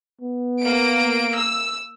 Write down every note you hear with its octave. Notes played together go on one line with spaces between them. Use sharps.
B3
A#3 D7
E6